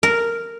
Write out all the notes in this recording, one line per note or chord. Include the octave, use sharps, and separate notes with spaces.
A#4